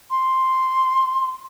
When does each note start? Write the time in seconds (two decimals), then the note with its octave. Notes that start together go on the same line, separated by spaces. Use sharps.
0.11 C6